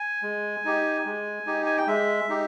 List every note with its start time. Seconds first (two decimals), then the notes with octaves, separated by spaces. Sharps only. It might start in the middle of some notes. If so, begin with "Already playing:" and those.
Already playing: G#5
0.23 G#3
0.65 D#4 G4
1.06 G#3
1.47 D#4 G4
1.66 G#5
1.77 G5
1.87 G#3 E5
2.29 D#4 G4